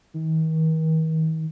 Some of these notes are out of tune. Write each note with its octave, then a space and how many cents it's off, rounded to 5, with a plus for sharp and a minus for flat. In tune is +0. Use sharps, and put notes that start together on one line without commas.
D#3 +40